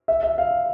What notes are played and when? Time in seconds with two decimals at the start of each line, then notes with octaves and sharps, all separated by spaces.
0.08 E5
0.23 E5
0.38 F5